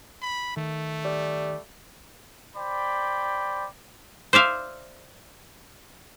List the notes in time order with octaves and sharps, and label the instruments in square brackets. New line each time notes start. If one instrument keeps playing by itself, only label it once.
[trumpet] B5
[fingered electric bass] D#3 [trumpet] A3
[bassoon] G3
[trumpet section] C5 D5 G5 B5
[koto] C5 D5 E5 F5